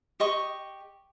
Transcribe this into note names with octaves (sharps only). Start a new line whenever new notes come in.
G4 D#5 C#6